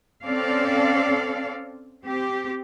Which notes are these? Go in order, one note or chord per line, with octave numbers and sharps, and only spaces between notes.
C4 C#4 A4 D5 F5
C4 G4